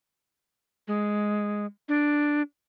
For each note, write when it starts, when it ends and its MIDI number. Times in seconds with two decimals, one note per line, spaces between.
0.88 1.66 56
1.89 2.42 62